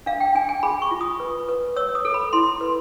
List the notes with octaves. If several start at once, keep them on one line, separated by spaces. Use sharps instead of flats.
D4 F5
G5
D4 G#5
G#5
G#4 B5
C#6
F4
D#6
B4
B4
C#5 E6
D#6
A4
B5
E4 C6
B4